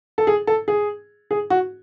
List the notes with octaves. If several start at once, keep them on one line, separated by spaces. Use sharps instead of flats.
A4
G#4
A4
G#4
G#4
F#4